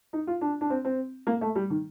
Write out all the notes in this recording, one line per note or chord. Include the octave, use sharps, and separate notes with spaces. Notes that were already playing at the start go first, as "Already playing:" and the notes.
D#4
F4
D4
D4
C4
C4
A#3
A3
G3
D#3